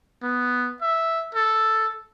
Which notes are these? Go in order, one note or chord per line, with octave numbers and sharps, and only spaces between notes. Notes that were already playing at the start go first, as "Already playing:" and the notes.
B3
E5
A4